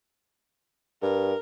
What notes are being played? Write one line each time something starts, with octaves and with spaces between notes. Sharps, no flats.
G2 A#4